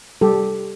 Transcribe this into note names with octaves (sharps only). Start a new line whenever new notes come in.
G3 G4 A4